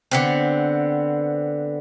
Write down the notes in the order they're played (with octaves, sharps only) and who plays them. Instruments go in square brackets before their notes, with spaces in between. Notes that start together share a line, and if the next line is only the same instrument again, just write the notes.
[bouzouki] D3 B3 C4